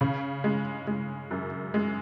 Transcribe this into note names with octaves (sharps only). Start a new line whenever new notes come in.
C#3
G#3
G#3
F#2
G#3